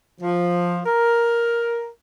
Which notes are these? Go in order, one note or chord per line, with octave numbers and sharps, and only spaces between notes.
F3
A#4